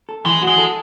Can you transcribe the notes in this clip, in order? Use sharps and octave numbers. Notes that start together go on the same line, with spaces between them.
A4
E3 G#3
F#4
G#3
A4